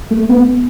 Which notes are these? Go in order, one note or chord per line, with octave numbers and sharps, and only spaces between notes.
A3
B3